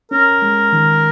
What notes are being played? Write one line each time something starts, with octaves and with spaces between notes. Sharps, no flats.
C#4 A#4
G#3
D#3